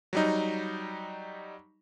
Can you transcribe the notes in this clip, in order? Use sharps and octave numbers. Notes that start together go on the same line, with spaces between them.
F#3 G3 D#4